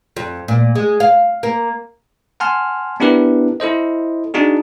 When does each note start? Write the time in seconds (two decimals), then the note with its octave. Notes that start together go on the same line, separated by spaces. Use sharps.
0.17 F2
0.48 A#2
0.75 G#3
1.00 F5
1.43 A#3
2.40 F#5 G#5 A5 C6 F6
3.00 B3 D4 E4 G4 A#4 B4
3.60 E4 A4 C5 D#5
4.34 D4 D#4 F#4 G#4